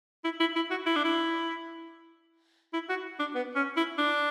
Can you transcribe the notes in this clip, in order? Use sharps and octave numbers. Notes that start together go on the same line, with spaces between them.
E4
E4
E4
F#4
E4
D4
E4
E4
F#4
D4
B3
C#4
E4
D4